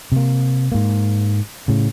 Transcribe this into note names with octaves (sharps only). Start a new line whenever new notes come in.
C3 A#3
G#2 A#3
A2 C#3